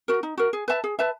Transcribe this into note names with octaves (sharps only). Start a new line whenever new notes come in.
F#4 A#4
D#4
F#4 A#4
G#4
B4 E5 A5
G#4
B4 E5 A5